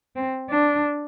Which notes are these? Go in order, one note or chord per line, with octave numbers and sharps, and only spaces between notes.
C4
D4